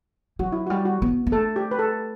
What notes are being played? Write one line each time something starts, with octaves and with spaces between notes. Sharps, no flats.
F#3 F#4
E4
F#4
G3
F#4
B3
B3
A3 A4
G4
B4
A4